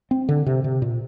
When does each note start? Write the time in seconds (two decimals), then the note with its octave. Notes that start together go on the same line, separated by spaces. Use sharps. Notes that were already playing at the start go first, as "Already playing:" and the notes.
0.11 C4
0.29 D3
0.46 C3
0.64 C3
0.82 A#2